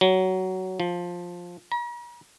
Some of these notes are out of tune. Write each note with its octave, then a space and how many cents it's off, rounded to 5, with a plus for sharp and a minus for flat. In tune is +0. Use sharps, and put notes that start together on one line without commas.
F#3 +15
F3 +10
A#5 +45